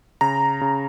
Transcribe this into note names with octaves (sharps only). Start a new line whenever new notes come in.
C#3 A#5
C#3